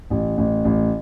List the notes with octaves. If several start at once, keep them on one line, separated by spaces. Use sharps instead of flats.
A1
A1
A1